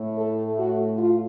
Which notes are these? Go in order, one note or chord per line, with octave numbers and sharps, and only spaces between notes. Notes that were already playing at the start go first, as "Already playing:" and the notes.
Already playing: A2 A3
A4
F#4
F4